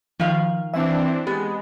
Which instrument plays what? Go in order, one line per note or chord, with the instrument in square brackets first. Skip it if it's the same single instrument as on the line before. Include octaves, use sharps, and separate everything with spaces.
[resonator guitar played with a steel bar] D#3 F5 [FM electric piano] F3
[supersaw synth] E3 C4 D4 [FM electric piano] E5
[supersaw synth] G#3 [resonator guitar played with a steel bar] B3 [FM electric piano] G4